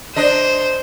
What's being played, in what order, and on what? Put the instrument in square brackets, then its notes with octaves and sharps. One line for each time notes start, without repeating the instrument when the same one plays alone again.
[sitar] D4 D#5 [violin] C5